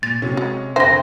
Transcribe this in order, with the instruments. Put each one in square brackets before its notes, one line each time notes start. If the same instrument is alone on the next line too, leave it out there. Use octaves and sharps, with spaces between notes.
[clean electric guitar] A#2 [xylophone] A6
[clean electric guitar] C3 [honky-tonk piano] F#3 C#4
[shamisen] G#3
[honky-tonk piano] F2 D3 G5 [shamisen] C5 [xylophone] E5 A#6